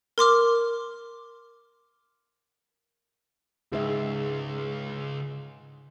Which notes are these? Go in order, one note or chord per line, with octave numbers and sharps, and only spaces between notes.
A#4 C6 D6 F6
C#2 G#2 G#3 G#4 E5